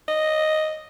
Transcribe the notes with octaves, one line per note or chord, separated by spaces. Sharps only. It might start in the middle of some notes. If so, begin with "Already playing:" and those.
D#5